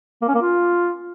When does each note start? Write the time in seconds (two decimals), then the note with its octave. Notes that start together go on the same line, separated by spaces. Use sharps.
0.22 A#3
0.28 C#4
0.35 A#3
0.41 F4